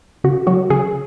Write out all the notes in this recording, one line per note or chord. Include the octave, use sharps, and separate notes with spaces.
C#3 F#4
F#3 F#4
C#3 G#4